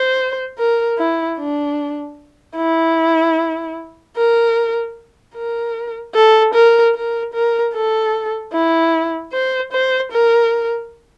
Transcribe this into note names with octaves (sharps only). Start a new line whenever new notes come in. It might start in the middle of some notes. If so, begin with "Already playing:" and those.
Already playing: C5
A#4
E4
D4
E4
A#4
A#4
A4
A#4
A#4
A#4
A4
E4
C5
C5
A#4